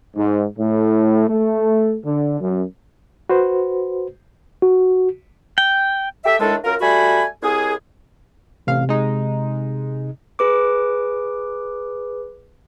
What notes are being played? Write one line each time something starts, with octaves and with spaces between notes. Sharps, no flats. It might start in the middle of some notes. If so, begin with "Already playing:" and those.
G#2
A2
A3
D3
F#2
F#4 B4 C5
F#4
G5
G4 A4 E5
A2 D#3 G#3 D4 A4
F#2 F4 A#4
G3 A3 F#4 G#5 B5
C2 G#4
A1 C3 F5
G#3 D#4
G#4 B4 D6